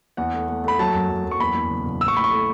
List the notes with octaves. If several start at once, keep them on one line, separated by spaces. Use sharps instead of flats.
E2 F#5
A3
A3
A3 B5
F#3 A5
F#2
F#2
F#2
C#6
E2 B5
E2
F#1
F#1
A1 E6
C#6
A2 B5
C#6
A3